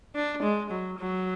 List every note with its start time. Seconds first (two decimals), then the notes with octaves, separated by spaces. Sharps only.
0.15 D4
0.43 G#3
0.71 F#3
0.99 F#3